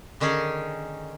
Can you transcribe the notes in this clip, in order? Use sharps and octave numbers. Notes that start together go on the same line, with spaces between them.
D3 D#3 C#4 D#4 G#4